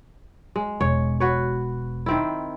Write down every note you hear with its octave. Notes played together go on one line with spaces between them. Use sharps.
G#3
E1 C#5
F#4 B4 C#5
D#3 C4 E4